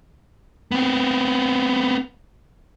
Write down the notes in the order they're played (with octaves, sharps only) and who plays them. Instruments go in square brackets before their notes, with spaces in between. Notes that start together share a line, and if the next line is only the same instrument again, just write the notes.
[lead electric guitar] B3 C4